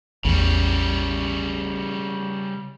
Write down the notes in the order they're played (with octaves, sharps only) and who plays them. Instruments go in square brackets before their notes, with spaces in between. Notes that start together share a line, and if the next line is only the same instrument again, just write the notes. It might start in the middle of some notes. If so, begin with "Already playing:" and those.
[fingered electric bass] A1 E2 [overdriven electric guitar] C#3 G3